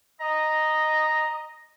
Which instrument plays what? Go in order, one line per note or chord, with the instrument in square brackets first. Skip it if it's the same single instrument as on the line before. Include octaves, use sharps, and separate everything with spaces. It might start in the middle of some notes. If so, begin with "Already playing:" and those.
[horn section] D#5 [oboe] A#5